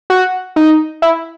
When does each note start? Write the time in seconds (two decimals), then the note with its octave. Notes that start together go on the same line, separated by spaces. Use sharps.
0.10 F#4
0.56 D#4
1.02 E4